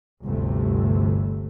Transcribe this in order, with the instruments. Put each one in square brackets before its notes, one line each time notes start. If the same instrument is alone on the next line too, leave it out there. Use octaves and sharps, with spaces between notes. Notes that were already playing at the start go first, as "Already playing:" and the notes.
[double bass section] G1 D2 C3 A3